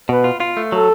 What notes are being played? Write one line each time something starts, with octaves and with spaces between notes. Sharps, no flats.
B2 B4
F4
F4
A3
F#3 A4